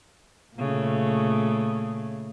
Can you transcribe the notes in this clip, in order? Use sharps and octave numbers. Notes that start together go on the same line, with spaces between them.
A#2 C#3 A3